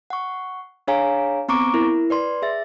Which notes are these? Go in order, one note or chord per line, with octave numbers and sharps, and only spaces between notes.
F#5 C#6
D4 G#4 C#5 F5 G#5 A#5
B3 C4 A#5 C#6 D6 D7
E4 A#4
B4 D5 C6
G#4 E5 A6